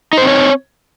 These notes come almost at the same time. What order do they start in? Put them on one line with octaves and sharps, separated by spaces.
D#4 C5 C4 C#5